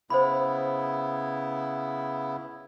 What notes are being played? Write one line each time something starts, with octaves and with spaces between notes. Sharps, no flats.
C#3 B3 E4 C5 B5